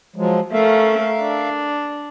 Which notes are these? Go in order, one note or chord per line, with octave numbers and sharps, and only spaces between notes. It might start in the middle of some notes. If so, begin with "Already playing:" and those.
F3 F#3 G#3
A3 C#4 A#4 E5 F5
D4